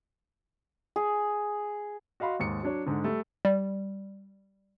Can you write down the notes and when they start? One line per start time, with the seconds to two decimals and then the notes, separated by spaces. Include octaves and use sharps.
0.96 G#4
2.20 F#4 D#5 F5 B5 C6
2.39 D#2 G#2 C#7
2.63 F#3 D4 C#5
2.86 G#2 D3
3.04 G3 A3
3.45 G3